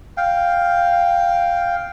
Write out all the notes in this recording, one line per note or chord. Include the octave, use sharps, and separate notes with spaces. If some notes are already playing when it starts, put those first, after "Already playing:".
F5 G5